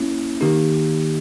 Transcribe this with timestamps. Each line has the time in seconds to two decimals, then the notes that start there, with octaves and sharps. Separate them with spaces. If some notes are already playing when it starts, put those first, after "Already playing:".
Already playing: A#3 C#4 E4
0.41 D#3 A#3 D#4 G4